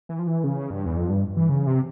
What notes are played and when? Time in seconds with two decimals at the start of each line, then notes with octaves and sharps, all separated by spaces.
0.09 E3
0.19 F3
0.27 E3
0.44 C#3
0.70 G2
0.86 E2
0.97 F2
1.10 G2
1.37 E3
1.49 C#3
1.67 C3